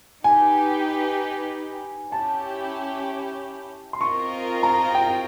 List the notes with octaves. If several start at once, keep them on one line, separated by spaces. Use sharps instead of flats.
D#4 G4 B4 G#5
C#4 E4 G4 A5
C6
C4 F4 A#4 D#5 C#6
A#5
G5